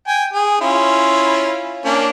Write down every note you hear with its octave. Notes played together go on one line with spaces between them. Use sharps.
G5 G#5
G#4
C#4 E4 F4
A#3 C#4 D4